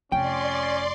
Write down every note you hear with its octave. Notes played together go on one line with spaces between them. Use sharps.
F1 C#4 D5 G5 C6